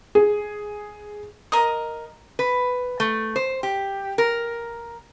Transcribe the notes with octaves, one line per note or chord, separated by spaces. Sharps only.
G#4
A#4 D#5 D#6
B4
A3
C5
G4
A#4